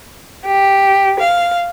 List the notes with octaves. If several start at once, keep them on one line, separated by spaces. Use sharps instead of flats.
G4
F5